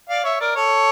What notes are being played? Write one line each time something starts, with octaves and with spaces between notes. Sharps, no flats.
D5 F5
C#5 E5
A#4 D5
A4 C#5